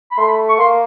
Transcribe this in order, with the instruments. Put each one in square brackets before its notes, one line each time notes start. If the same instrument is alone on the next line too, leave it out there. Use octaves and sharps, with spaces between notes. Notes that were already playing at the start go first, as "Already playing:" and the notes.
[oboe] B5
[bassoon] A3 [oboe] C6
[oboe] B5
C#6
[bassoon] A#3 [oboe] C6